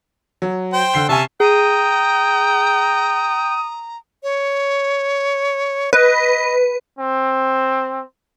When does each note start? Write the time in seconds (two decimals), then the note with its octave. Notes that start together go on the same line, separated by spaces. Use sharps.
0.42 F#3
0.73 C5 G5
0.94 D3 C7 G7
1.09 C3 C#4 E5 G#5 A5
1.40 G#4 G5 A#5 D#6
4.23 C#5
5.93 B4 D#5
6.99 C4